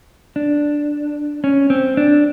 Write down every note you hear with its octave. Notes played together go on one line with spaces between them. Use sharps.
D4
C#4
C4
D4